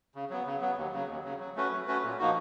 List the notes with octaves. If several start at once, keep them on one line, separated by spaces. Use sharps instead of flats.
C#3
F#3 B3
C#3
F#3 B3
D#2
C#3 F#3
D#2
C#3 F#3
F#3
A3 C#4 F#4 B4
F#3
A3 C#4 F#4 B4
A#2
F3 A#3 D#4 F#4